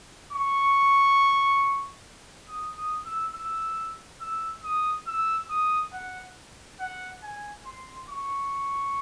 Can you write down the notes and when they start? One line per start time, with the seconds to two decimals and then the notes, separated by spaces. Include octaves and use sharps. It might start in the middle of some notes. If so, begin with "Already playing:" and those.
0.32 C#6
2.48 D#6
2.77 D#6
3.06 E6
3.34 E6
4.21 E6
4.63 D#6
5.07 E6
5.50 D#6
5.93 F#5
6.80 F#5
7.23 G#5
7.66 C6
8.09 C#6